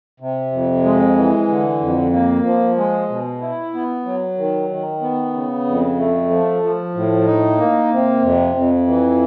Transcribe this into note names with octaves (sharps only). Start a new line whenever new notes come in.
C3
F2
G#3
E3
D3
F2
A#3
F3
G#3
B2
E4
B3
F#3
D#3
D#3
B3
C#3
F2
A3
F3
F3
A2
D#4
A#3
C3
F2
F2
E3